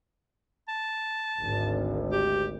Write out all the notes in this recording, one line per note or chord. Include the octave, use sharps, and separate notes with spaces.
A5
G#1 D2
G4